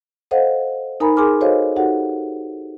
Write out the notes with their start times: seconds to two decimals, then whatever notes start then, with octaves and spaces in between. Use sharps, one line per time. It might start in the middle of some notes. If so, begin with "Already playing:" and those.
0.31 A4 C5 D#5 F5 F#5
1.00 D#4 A#4 G#5 A#5 B5
1.17 G#4 A#4 G#5 C6 D6 F6
1.41 F#4 A4 C5 C#5 D#5 F5
1.76 D#4 F#4 G4 A4 F#5